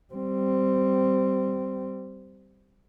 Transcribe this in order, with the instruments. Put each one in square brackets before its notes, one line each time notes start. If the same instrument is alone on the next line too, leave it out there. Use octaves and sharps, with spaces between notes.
[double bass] G3 C4